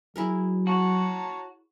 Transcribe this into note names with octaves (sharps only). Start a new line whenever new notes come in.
F#3 E4 G#4 A#4
F#4 C#5 A5 A#5